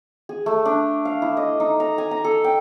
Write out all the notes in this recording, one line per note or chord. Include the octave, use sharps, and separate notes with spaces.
G#4
A3
D4
F5
E4
D#5
D#4
A#5
G#5
A#5
A4
G5